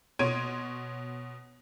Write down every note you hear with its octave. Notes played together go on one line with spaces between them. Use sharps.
B2 C#5 C6 G#6 D7 D#7